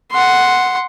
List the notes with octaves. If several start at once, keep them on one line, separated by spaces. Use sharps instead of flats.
F#5 C6